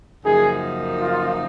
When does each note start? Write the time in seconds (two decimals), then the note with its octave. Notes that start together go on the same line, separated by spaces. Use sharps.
0.24 F#2 C#3 F3 A#3 D#4 G#4
1.00 F4